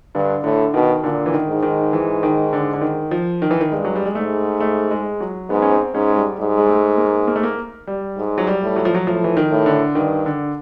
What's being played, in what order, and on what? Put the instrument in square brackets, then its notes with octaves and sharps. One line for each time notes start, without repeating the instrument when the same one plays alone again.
[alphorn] G2 [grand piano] D3
[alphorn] A2 [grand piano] D3
[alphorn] B2 [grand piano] D#3
[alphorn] A#2 [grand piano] D3
[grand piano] E3
D#3
[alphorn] G#2
[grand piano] D#3
E3
D#3
D3
D3
D#3
F3
D#3
E3
D#3
[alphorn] G2 [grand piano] G#3
[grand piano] F#3
G3
G#3
[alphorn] G#2 [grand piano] A3
[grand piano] A3
G#3
F#3
[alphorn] G#2 [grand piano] B3
[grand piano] C#4
C4
[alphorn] G#2 [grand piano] C#4
[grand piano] G#3
G3
[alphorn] G#2 [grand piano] G3
[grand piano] G#3
A3
A#3
A#3
A3
A#3
G3
[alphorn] G#2
[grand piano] F#3
G3
[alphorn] A2
[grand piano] F#3
F3
F#3
[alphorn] A2 [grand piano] F3
[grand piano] E3
D#3
[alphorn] A2
[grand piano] D3
[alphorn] G2 [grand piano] D#3
[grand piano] D3